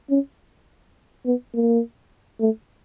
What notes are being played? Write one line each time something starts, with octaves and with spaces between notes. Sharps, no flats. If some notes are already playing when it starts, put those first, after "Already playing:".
C#4
B3
A#3
A3